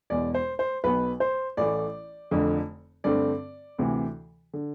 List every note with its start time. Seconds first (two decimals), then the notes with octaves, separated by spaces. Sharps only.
0.10 E1 E2 B2 D5
0.34 C5
0.59 C5
0.84 B1 B2 B3 B4
1.20 C5
1.57 A1 A2 E3 A3 D5
2.31 F1 F2 D3
3.04 G2 D3 A3 C4 D5
3.78 D2 C3 E3
4.53 D3